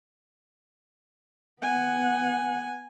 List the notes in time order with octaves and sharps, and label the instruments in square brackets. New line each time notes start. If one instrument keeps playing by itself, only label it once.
[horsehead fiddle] B3 F#5 [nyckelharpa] G#5